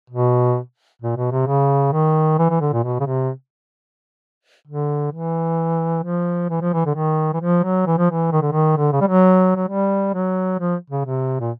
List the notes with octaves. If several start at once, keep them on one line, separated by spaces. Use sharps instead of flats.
B2
A#2
B2
C3
C#3
D#3
E3
E3
D3
A#2
B2
C#3
C3
D3
E3
F3
E3
F3
E3
D3
D#3
E3
F3
F#3
E3
F3
E3
D#3
D3
D#3
D3
C#3
G3
F#3
F#3
G3
F#3
F3
C#3
C3
A#2